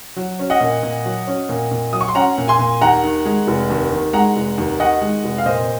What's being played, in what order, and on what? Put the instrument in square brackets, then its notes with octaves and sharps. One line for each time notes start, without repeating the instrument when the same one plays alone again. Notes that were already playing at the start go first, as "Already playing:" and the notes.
[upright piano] F#3
C#4
D#5 F#5
A#2
A#2
F#3
C#4
A#2
A#2
F#3 D#6
C#6
C6
C#4 F#5 A#5
A#2
G#5 C6
A#2
D#2 F#5 A#5
D#3
G#3
F1
D#2
D#3
G#3 F#5 A#5
F1
D#2
D#3 D#5 F#5
G#3
F1
F5
A#2 C5 D#5